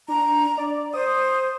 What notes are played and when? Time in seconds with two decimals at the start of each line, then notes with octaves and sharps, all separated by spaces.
0.08 D4 A#5
0.58 D5
0.94 C5 D#6